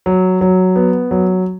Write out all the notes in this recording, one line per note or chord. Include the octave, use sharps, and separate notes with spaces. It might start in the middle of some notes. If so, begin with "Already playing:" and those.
F#3
F#3
B3
F#3